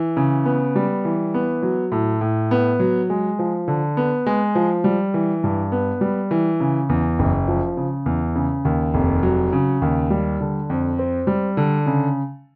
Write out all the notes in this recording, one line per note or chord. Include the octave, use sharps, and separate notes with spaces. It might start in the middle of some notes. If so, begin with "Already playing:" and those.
Already playing: E3
C#3
B3
G3
E3
B3
F#3
A2
A2
B3
F#3
G#3
F3
D3
B3
G#3
F3
G3
E3
G2
B3
G3
E3
C#3
E2
F#1
F3
C#3
E2
C#3
D#2
F1
F#3
C#3
D#2
G3
D3
F2
C4
G3
D3
C#3